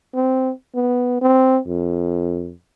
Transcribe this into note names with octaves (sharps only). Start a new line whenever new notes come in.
C4
B3
C4
F2